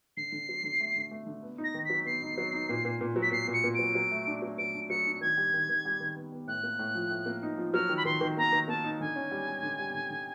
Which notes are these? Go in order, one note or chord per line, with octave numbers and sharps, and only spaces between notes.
D3 C7
D3
F#3
D3
A3
D3
A3
D3
B3
D#4
A#6
D#3
F#3 B6
B3 C7
D#4
F#3
D#4
A#2
A#2
A#2
F#3
B6
A#2 C7
A#2
C#7
A#2
F#3 D7
F#3
A3
D4
F#3
F#3 D7
D4
F#3 C#7
D4
D#3 G#6
G3
D#3
D#3
G3
D#3
B3
B3
A2 F#6
A#3
A2
F3
A2
A#3
D#4
F3
F#3 F6
D#3
B5
D#3 C6
D#3
A#3 A#5
D#3
A#3 A5
D#4
D3 G#5
C#4
G3
G3
D3
G3
D3
D3